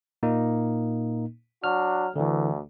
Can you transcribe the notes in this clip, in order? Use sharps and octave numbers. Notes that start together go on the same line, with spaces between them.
A#2 A#3 D#4
F#3 D4 F#4 F6
D2 D3 E3